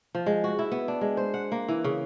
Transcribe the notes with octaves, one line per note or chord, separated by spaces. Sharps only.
F3
G#3
F#4
E4
B3
D4
G#3
C5
F#5
A#3
E3
C#3